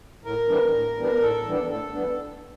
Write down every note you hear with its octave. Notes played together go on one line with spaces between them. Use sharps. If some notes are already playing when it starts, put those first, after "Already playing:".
A2 A#4
E3 G3 B3 D4
A2
E3 G3 B3 D4
A2 A4
E3 G3 B3 D4
A2 A4
E3 G3 B3 D4